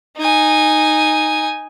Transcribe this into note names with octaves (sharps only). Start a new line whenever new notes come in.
D#4 G#5